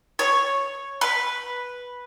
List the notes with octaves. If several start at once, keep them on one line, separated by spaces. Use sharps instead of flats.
C#5
B4